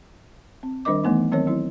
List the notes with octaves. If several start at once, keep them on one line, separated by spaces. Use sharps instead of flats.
C4
D#3 G3 D4 A#4 D#5 D6
E3 A3 B3 D#4
D#3 F#3 C4 A#4 C#5
F#3 C4 E4